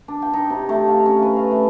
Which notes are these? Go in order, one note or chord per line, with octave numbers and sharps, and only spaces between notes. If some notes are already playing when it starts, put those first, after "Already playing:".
D4
G5
D#4
C3
A3
F5
C#4
B4
F5
A3